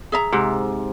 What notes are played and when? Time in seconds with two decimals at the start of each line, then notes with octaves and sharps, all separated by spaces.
0.12 G#4 E5 A#5
0.33 G#2 C3